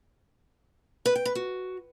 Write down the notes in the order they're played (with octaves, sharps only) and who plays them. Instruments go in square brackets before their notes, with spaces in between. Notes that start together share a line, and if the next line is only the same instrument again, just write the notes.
[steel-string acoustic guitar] B4
G5
B4
F#4